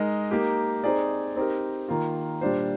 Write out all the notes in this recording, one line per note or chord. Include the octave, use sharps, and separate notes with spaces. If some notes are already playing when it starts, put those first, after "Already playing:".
Already playing: G#3 D#4 A#4 D#5
A#3 D#4 G4
C4 D#4 G#4 D5
C4 D#4 G4 A#4
D#3 A#3 F4
A#2 G3 D4 F4 C5